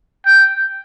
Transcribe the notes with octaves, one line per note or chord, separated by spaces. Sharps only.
G5